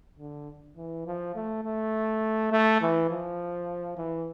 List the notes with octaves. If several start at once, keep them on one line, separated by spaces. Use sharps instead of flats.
D3
E3
F3
A3
A3
A3
E3
F3
E3